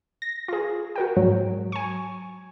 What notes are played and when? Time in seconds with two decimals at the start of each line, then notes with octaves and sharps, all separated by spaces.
0.22 A#6
0.48 F4 G#4
0.96 F#4 A#4 G5
1.17 G#2 F#3
1.72 G#5 C#6